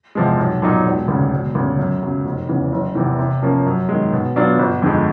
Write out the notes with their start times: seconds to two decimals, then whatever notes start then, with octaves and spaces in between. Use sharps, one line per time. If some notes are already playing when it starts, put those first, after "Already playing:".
0.15 E2 C3 F3 G#3
0.38 B1
0.62 A#2 F#3 A#3 D#4
0.86 E1
1.08 D2 C#3
1.33 E1
1.55 D2 C#3
1.79 F#2
2.03 C#3 F#3
2.25 F1
2.49 E2 C#3 E3
2.72 F#1
2.95 E2 C3 E3
3.19 C3
3.42 F3 A#3 C#4
3.66 F#2
3.89 D#3 G#3
4.13 B2
4.36 F#3 B3 D4 F4
4.59 G1
4.82 F2 D3 F3 G#3